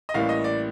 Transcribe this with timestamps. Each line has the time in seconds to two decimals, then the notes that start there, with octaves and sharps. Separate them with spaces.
0.09 D#5
0.14 A1 A2 G3 A#3 F5
0.29 D#5
0.44 D5